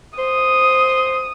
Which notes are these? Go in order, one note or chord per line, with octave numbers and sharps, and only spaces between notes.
C5 D#6